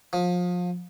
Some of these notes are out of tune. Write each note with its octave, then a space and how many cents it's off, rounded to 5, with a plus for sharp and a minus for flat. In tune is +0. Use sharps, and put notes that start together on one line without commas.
F3 +30